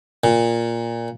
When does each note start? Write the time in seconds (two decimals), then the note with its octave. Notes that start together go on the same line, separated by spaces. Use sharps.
0.24 A#2